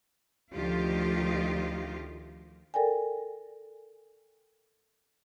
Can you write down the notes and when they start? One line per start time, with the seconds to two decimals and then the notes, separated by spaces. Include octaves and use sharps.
0.53 D2 D#3 F3 F4 G4 D#5
2.74 A4 A#4 D5 G5 G#5